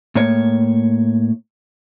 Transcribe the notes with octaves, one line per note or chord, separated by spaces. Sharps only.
A2 A#3 C#5